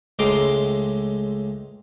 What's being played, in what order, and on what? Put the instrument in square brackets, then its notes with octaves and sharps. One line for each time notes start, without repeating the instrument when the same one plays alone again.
[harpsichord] C#2 A2 G#3 A#5 C6 D6